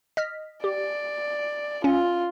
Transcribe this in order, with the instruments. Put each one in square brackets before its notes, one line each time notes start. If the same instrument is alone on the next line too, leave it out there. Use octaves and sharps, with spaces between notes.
[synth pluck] D#5 F6 B6
[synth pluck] G4 [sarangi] D5
[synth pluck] C#4 [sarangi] F4